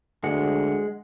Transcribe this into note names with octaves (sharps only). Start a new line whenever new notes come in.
D2 G#3 F#5